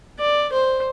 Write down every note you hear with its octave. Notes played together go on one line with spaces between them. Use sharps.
D5
C5